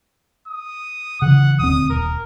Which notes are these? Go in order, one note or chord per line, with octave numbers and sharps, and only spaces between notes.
D#6
C#3 E3 F#5
D#1 D2 C4 D#6
D#1 A#4